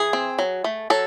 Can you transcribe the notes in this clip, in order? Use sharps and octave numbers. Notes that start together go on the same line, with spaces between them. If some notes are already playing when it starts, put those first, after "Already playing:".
Already playing: E3 G#4
C4
F#3
A3
F#3 A4